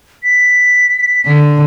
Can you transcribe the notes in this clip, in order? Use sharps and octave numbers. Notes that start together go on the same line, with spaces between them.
B6
D3